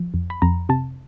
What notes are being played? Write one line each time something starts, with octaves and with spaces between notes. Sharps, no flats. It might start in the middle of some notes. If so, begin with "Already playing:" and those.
Already playing: F3
F2
B5
F2 A#5
C3 A5